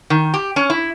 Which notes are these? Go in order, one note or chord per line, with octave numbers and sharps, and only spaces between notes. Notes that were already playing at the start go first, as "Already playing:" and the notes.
D#3
G4
C#4
E4